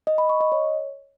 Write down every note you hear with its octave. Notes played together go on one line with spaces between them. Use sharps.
D#5
B5
C#6
D#5
C#5